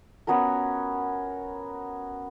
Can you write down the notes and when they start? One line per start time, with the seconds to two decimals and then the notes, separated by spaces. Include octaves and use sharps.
0.27 B3 C#4 F#4 A#4